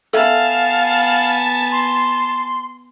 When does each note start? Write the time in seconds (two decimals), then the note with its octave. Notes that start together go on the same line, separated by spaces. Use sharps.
0.13 B3 A4 E5 F5 G#5 A5
1.72 C6